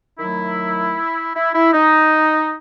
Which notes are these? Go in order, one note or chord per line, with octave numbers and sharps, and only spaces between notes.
D#3 F#3 A3 E4
E4
E4
D#4